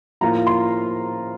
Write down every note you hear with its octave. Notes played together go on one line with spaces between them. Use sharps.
A2 F3 A#3 F4 A#5
C6